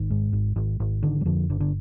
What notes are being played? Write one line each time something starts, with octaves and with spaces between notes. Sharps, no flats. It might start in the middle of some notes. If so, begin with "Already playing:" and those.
Already playing: G#1 D#3
G#2
G#1
G#1
G#1
D3 D#3
G3
F2 D3 F3
G1 D3
D3